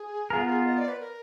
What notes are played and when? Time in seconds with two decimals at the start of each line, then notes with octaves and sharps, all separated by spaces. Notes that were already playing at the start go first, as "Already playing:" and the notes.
Already playing: G#4
0.30 B3 F4 A#4
0.66 D#5
0.78 D5
0.88 B4
1.00 A#4